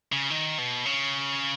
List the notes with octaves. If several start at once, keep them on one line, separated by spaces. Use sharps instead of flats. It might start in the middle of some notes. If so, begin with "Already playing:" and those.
C#3
D#3
B2
C#3